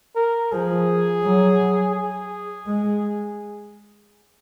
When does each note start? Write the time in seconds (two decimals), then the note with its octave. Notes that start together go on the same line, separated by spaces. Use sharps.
0.16 A#4
0.52 F3 G#4
1.24 F#3
1.95 G#4
2.67 G#3